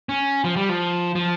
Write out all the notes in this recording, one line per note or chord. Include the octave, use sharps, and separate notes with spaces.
C#4
F3
G3
F3
F3